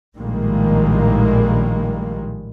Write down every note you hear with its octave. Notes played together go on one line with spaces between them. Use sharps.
A#1 A2 D#3 G3 G#3 A#3